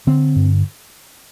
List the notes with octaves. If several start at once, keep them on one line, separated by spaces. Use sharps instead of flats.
D3 C4
G2